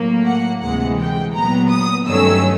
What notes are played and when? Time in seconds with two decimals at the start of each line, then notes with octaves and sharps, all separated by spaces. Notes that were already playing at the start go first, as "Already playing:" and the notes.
Already playing: A2 F#3 A#3
0.24 F#5
0.61 D2 C3 E3 G#3 F#5
0.98 G5
1.34 A#2 F#3 B3 A#5
1.70 D#6
2.07 G2 D#3 F#3 A3 C#4 E6